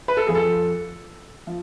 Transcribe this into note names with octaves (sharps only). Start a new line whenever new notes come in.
B4
A4
F2 F3 G#4
A4
F3